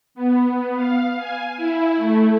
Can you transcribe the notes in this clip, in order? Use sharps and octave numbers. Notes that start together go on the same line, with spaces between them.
B3
F5
G#5
E4
A3